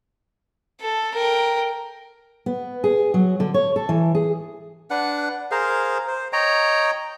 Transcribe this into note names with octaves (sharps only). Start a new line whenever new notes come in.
A4
A#4 G5
B3
G#4
F#3
D3
C#5
A4
E3
G#4
D4 B4 F#5
G#4 A#4 C5 F5
C5
C#5 D#5 G5 A#5